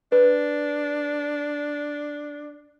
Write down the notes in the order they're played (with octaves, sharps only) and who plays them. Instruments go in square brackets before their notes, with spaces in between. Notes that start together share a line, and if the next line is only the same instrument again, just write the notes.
[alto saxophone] D4 [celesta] B4